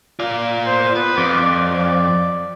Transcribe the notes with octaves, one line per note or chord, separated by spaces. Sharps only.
F4 D5
C5
B3 B4
F2 D6
D5